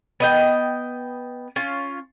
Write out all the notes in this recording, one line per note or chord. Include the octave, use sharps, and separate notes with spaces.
B3 D#5 G5
C#4 F4